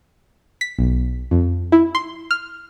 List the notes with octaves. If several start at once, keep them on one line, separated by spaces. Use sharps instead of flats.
B6
B1
F2
E4
C6
F6